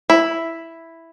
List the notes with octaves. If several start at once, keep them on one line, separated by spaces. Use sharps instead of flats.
E4